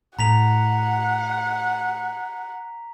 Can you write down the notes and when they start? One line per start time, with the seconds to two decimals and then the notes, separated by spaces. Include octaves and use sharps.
0.19 A2 F#5 A#5 B6 F7